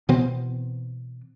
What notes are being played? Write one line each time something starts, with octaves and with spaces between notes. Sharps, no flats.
B2 E3 B3 C4